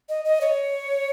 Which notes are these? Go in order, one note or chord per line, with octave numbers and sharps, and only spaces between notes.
D#5
D#5
C#5